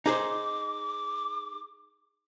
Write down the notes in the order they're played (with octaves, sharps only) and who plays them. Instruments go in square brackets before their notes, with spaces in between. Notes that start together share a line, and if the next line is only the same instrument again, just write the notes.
[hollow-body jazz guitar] D#4 G#4 C5 [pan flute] D6